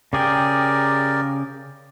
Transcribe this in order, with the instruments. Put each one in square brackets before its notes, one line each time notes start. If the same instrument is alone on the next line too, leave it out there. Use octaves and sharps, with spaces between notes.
[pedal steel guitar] C#3 G#4 G5 [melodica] G4 A#4 D5